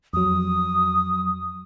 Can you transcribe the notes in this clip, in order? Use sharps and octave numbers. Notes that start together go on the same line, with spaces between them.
F2 F#3 D#6